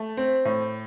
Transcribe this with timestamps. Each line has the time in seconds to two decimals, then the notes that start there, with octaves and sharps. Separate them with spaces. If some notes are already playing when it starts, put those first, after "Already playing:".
Already playing: A3
0.17 C4
0.45 A2